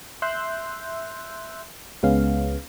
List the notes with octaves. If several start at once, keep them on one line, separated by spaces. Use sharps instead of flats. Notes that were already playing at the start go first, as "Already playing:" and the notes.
E5 C6 E6 F#6 G6
C#2 G#3 B3 C#4 F5